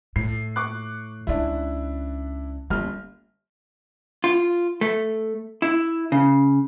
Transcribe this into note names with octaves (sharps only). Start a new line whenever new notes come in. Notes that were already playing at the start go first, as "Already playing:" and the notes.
A2 C7
C#6 D6 F#6
C#2 C#4 D4 E4
G1 A#3 C#4 F6
F4
A3
E4
C#3